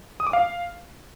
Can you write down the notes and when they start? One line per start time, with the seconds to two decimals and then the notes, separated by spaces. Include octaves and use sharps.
0.20 D#6
0.27 D6
0.33 F5